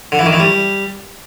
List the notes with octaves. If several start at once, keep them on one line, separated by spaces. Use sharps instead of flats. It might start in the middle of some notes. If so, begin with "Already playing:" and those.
D3
E3
D#3
E3
G3